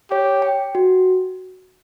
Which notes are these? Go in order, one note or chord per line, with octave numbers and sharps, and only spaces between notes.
G4 C#5
G5
F#4